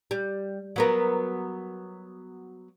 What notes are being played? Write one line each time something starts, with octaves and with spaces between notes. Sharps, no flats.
G3
F#3 B3 A#4